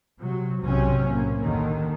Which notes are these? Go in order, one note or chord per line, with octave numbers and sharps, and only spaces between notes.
C3 F#3
B1 G#2 C3 F#3 C4 C#4
A2 A#3
D#2 D3 D#3